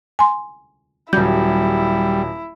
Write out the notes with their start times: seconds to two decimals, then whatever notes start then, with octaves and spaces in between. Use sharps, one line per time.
0.19 G#5 C6
1.13 D#1 F#3 G3 E4 G6